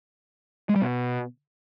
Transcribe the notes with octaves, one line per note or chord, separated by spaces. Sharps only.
G#3
G3
B2